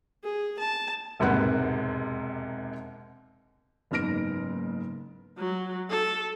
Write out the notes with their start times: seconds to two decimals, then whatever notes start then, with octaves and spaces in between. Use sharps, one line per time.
0.23 G#4
0.59 A5
1.19 E1 D#2 G#2 C3 B4 F#5
3.91 F#1 G#2 B3 F6 A#6 D7
5.38 F#3
5.90 A4